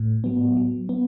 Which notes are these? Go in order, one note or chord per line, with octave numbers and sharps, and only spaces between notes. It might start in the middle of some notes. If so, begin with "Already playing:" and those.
Already playing: A2
F#3 B3
F#3
B3